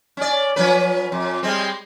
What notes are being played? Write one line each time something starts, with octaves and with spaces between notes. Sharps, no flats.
C#4 D5
F3 C#4 B4
F2
G3 G#3 C4